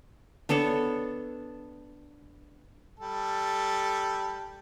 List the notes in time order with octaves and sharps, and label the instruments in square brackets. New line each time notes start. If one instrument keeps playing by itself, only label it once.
[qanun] B3 D4 A4 C#5
[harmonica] G3 A4